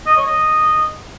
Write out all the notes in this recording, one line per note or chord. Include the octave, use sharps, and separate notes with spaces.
D#5
C#5
D#5